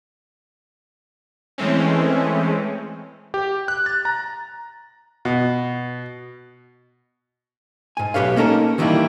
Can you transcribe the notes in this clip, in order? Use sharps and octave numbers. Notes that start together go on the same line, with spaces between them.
E3 G#3 A3 C4 C#4
G4
F#6
A6
A#5
B2
G#2 G#5
B1 C#3 G4 B4 C#5 F5
A#3 C#4 D#4 A4 A#4
D#3 E3 G3 A#3 D#4 E4